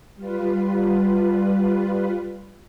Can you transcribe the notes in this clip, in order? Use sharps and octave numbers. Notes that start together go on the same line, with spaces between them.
G3 F4 B4